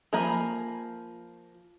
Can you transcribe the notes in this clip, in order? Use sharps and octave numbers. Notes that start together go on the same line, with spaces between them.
F3 A#3 G#5 A#5 B5